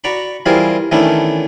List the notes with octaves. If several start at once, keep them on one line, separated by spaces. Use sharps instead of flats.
F#4 D5 A#5 B5
E3 G3 C4 F4 G#4 A#4
D#3 E3 A3 B3 C#4 D4